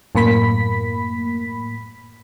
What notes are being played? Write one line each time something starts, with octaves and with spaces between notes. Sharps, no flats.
F#2 A2 A#3 B5 B6